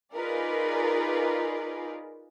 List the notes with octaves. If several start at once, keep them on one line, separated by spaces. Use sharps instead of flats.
D#4 F4 G#4 A#4 B4 D5